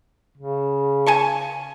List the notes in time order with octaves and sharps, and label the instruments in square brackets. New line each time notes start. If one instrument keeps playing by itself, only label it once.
[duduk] C#3
[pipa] G#5 A5 C#6